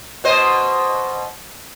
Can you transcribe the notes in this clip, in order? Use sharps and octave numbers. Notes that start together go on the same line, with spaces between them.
B2 C5 D#5